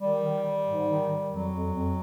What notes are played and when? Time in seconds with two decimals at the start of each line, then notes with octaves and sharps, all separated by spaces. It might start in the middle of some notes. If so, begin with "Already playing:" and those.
0.01 D#3 G3
0.23 D#3
0.44 D#3
0.66 G#2
0.88 D#3
1.09 D#3
1.30 F2 F#3
1.52 F2
1.73 F2